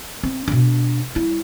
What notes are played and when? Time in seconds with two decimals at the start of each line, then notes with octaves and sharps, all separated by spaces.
0.24 C4
0.48 B2 D4
1.15 G3 E4